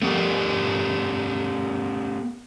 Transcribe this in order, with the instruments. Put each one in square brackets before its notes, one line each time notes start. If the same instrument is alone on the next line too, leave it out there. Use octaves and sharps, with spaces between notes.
[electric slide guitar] A3 B3 G4 A#4